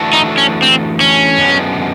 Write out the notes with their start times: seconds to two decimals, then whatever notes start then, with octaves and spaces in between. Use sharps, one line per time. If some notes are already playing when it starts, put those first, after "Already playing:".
Already playing: E3 A3 D4 F#4 A4
0.13 D#4
0.38 C#4
0.62 C4
1.00 C#4
1.38 F#2 D3 G#3 B3